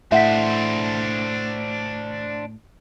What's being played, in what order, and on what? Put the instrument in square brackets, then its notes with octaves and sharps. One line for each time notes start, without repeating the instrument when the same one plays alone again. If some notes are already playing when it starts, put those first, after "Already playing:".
[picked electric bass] A2 [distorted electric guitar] D4 C5 [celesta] E5 F#5 B6